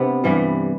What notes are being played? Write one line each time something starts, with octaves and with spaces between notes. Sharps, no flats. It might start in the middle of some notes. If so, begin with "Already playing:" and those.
Already playing: C3 B3 D4
G2 E3 G3